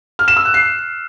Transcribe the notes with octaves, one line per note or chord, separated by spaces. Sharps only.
F6
E7
E6
F#6
C7